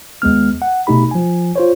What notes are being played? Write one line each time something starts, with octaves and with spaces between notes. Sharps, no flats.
D#2 G#3 B3 F6
F#5
B2 A3 D#4 G4 B5
F3 G#5
F4 C5 C#5